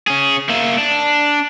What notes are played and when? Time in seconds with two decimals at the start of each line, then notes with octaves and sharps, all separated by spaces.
0.08 C#4 G#4
0.49 A#3 E4
0.78 D4